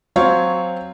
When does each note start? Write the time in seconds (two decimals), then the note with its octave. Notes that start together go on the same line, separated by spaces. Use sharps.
0.16 F#3 C4 C#5 F5